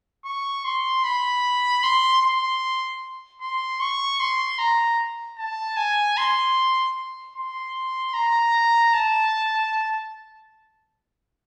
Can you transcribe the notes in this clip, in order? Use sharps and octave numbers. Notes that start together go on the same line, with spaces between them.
C#6
C6
B5
C6
C6
C6
C#6
C6
A#5
A5
G#5
C6
C6
A#5
A5